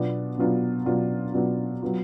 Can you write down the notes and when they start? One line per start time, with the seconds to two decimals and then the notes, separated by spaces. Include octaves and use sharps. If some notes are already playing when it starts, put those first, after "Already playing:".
Already playing: B2 F#3 B3 D4 F4
0.38 B2 F#3 B3 D4 F4
0.86 B2 F#3 B3 D4 F4
1.34 B2 F#3 B3 D4 F4
1.82 F#3 B3 F4